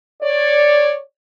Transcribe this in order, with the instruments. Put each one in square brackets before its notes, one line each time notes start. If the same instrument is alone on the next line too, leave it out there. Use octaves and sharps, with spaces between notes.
[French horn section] C#5 D5